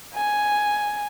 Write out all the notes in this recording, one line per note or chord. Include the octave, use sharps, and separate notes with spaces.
G#5